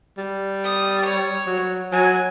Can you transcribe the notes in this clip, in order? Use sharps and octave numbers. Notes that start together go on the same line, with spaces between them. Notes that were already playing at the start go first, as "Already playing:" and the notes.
G3
D#6
C#5
F#3
F#3 G#5